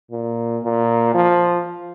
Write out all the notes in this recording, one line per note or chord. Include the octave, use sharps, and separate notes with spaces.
A#2
A#2
F3